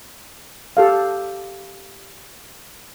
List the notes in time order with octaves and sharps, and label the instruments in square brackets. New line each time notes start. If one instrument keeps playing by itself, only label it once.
[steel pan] G4 A4 F5